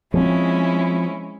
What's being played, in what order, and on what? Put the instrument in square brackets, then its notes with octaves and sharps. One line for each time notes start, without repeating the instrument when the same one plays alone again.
[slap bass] F3 C4 [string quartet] G#3 C#4 E4